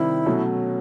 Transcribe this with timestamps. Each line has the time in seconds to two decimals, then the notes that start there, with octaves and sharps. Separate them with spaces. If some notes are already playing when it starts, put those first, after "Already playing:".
Already playing: C3 D#3 G3 C4 E4
0.26 B2 F#3 A3 C#4